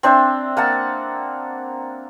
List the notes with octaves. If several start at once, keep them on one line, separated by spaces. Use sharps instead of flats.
C4 D4 C5 E5
A#3 F#5 A5